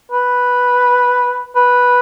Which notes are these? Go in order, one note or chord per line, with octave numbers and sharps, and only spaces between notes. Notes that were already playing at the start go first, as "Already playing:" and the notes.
B4
B4